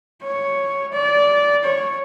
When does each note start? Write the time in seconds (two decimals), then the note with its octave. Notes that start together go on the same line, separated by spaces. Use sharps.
0.23 C#5
0.92 D5
1.63 C#5